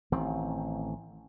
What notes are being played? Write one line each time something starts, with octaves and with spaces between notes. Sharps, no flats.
A1 D#3 C4